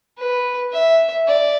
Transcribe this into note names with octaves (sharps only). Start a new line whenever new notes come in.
B4
E5
D5